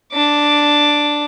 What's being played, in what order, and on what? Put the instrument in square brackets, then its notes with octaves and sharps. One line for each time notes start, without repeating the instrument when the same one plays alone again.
[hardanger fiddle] D4 D6